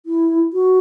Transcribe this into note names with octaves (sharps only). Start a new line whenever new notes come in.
E4
F#4